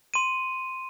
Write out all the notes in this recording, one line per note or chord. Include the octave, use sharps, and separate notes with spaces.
C6 D#7